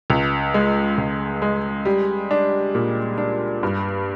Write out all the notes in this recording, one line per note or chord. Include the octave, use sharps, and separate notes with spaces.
C#2
G#3
C#2
G#3
G3
D4
A#2
D4
G2